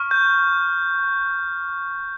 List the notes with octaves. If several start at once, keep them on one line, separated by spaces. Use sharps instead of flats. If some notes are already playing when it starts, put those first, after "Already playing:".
Already playing: C#6 F6
G6